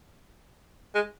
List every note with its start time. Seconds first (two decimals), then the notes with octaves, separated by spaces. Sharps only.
0.95 G#3